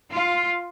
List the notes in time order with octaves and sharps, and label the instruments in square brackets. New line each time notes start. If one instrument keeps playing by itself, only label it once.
[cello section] F4